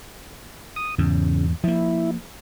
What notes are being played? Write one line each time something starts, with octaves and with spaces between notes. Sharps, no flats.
D#6
E2 G#2 C#3
F3 A#3 E4